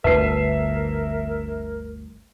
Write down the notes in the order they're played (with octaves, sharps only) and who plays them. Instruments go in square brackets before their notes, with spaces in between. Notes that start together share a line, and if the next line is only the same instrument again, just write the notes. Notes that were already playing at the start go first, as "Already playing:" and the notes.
[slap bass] G1 D2 [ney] A#4 [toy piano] B4 A5 [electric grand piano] E5 C7